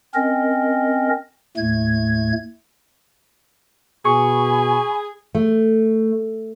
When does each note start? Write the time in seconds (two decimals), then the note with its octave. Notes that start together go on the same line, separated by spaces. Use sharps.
0.15 C4 C#4 A#4 D#5
1.57 D#2 A2 A3 G#6
4.05 B2 G#4 G#5 B5 C#6
5.35 A3